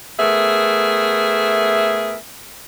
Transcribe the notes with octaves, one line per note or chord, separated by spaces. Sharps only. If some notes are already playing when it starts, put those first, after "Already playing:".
A3 B3 G#4 A#4 E5